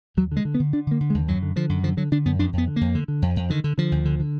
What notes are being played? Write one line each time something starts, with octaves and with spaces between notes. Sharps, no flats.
D#2 F#3
D3
G#3
D3
B3
D3
D3 D4
D3 A#3
D3
G#3
D#2
F#2 F#3
D3
D3 F3
F#2
D3 F3
D3 F#3
D3 D4
F#2 B3
F2 D4
F2 B3
D3
F2 A#3
D3
D3
F2
F2
D3 D#3
D3
D3 F3
D2
D3
D3